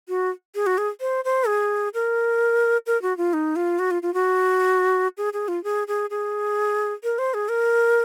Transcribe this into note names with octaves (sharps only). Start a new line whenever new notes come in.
F#4
G#4
F#4
G#4
C5
C5
G#4
A#4
A#4
F#4
F4
D#4
F4
F#4
F4
F4
F#4
G#4
G#4
F4
G#4
G#4
G#4
A#4
C5
G#4
A#4